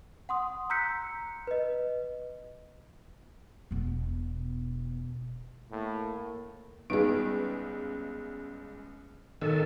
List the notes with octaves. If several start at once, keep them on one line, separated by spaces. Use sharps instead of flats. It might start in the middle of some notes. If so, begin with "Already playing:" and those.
F#5 C6 D#6
A#5 E6 F#6 G6 B6 C#7
B4 D#5
E1 B2
A2 A#3
C#2 G3 G#3 B3 D#4 G#4 F5
B1 D#3 A4